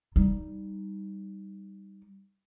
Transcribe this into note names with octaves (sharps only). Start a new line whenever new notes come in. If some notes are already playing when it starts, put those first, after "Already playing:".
G3 D#4